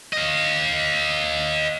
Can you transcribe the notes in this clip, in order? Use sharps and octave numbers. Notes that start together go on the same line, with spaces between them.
D#5 F5